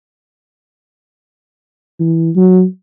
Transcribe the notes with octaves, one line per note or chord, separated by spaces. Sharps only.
E3
F#3